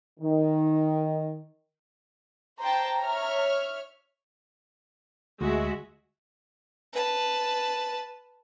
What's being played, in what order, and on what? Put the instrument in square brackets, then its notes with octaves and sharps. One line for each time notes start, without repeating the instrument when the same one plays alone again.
[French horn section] D#3
[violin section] C5 G5 A5 [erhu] A#5
[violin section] C#5 E5 F6
[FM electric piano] D2 [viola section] G#3 F#4 E5
[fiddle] B4 A5